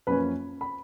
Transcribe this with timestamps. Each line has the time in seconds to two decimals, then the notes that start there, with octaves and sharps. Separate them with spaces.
0.07 F#2 F3 A#3 C#4 B4 B5
0.61 B5